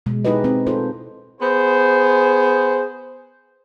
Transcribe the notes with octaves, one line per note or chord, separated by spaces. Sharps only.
B2 G#3
D#4 E4 G4 G#4 B4 D#5
C4
D#4 F4 A4 C5
B3 G#4 C5